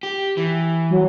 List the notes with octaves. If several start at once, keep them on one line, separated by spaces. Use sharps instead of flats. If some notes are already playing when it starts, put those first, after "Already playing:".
G4
E3
F#3